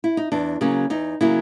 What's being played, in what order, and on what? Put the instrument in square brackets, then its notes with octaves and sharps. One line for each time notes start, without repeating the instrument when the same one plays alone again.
[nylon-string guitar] E4
D#4
E2 D4
C#3 F#3 A#3 C#4
E2 D#4
C#3 F#3 A#3 E4